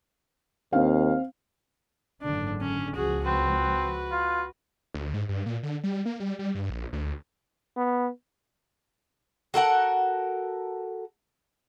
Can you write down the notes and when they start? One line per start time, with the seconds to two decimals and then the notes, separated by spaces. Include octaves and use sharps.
0.73 D#2 C4 F5
2.22 F#1 G#2 D3 D4
2.61 C#4
2.95 C#2 F3 F#4 G#4
3.25 C4 F#4 B4
4.11 F4
4.94 D2
5.14 G#2
5.29 G2
5.46 A#2
5.63 D3
5.84 G3
6.05 A#3
6.20 G3
6.39 G3
6.55 G2
6.70 A#1
6.93 D2
7.77 B3
9.54 F#4 A4 A#4 F#5